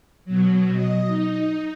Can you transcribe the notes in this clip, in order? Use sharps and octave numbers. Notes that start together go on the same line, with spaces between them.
B2 F#3
D#5
D#4